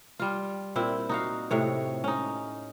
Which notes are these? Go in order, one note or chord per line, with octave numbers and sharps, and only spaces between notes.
G3 F4
A#2 C4 E4
D#4 F#4 F5
A2 C3 C#5
C#4 D#4